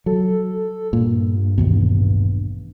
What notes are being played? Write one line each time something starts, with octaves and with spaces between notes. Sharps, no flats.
F#3 A4
G2 A#2
A1 D#2 B2